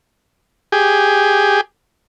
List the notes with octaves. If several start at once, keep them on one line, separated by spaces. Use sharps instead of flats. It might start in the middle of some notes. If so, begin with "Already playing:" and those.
G4 G#4